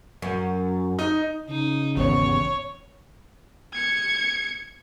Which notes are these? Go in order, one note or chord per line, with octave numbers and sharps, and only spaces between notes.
F#2
D#4
C#3 D#4
G#1 E2 C#5
G#6 C#7